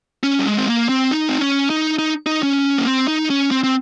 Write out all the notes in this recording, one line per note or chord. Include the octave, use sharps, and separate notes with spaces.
C#4
G3
G#3
C4
A#3
C4
D#4
C4
C#4
D#4
D#4
D#4
C#4
A#3
C4
D#4
C#4
C4
C4